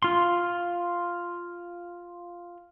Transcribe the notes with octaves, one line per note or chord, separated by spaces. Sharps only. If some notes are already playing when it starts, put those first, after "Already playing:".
F4 C6